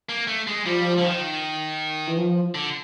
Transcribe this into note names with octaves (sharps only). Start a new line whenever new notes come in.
A#3
A3
G#3
F3 G3
D3
D#3
E3
F3
D3